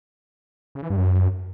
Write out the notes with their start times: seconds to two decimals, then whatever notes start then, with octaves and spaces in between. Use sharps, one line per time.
0.75 C#3
0.83 E3
0.90 G2
0.97 F#2